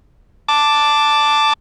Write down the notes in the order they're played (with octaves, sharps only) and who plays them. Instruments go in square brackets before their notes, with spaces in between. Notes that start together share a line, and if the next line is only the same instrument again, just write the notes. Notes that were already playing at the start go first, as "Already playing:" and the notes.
[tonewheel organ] A5 D6